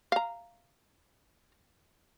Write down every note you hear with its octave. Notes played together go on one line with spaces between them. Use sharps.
F5 A#5